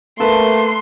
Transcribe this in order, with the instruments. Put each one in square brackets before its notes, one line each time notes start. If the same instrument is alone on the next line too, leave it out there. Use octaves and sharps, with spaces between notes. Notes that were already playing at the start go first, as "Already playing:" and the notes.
[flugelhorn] A3 [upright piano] A#3 A4 B4 [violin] C6